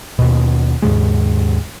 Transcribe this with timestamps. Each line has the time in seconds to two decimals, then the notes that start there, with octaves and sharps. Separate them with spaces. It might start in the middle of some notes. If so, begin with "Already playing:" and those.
0.19 D#2 B2
0.82 D#2 G#2 C#3 G#3